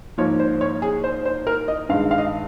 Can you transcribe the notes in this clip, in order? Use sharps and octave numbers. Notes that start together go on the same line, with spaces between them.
G#2 F3 A#3 C#5
C5
C#5
G#4
C5
C5
A#4
D#5
G2 D#3 G#3 F5
F5
D#5